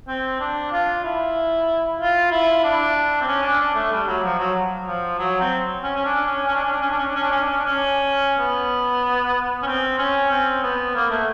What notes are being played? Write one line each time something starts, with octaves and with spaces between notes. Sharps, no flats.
C4
D4
F4
E4
F4
E4
D4
C4
C#4
D4
D4
A3
G3
F#3
F3
F#3
F3
F#3
C4
C#4
C#4
D4
C#4
C#4
D4
C#4
D4
C#4
D4
C#4
D4
C#4
D4
C#4
D4
C#4
D4
C#4
B3
C#4
C4
C#4
C4
B3
A#3
A3